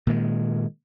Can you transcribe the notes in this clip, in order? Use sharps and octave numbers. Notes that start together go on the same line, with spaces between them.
A#2 D#3 G#3